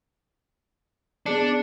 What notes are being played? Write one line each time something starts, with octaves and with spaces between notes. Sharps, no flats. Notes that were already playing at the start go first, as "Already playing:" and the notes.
B3 D4 G#4 C#7